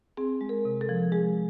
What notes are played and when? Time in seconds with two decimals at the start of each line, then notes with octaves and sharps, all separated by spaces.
0.17 C4 G#4
0.41 G#3
0.49 A#4
0.65 C3
0.81 A4
0.89 F3
1.12 G#3 G#4